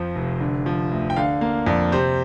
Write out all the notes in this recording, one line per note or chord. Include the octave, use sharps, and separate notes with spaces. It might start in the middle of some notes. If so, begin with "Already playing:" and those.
Already playing: F2 F3 C5
F1
D3
F3
D2
G5
D3 F5
A#3 F5
F2 D5
C3 C5